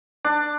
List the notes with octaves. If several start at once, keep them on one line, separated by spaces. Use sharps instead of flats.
D4